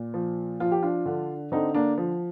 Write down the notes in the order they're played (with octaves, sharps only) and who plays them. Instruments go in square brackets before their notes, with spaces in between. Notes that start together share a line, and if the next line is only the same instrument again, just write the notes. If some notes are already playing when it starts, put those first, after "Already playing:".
Already playing: [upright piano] A#2
F3
F3 F4
G4
D4 F4
D3
D3 C4 D#4
A#3 D4
F3